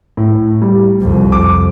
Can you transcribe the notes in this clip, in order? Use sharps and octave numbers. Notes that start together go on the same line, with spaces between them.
A2
G3
C2 F2
D6